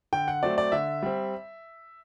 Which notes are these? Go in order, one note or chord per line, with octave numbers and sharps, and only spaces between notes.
D3 G5
F#5
F#3 A3 C4 D5
D5
D3 E5
G3 C4